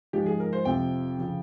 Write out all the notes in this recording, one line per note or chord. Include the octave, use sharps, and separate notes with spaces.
G#2 F3 G#3 G4
G#4
A#4
C5
F2 C3 F3 C4 G5
C#3 F3